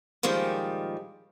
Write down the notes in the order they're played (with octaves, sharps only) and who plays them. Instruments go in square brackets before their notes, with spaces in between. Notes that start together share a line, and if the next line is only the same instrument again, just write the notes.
[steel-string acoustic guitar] A#2 D#3 F3 G3 G#3